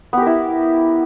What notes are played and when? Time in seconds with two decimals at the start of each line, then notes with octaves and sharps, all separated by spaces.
0.13 B3
0.17 G4
0.22 A#4
0.26 E4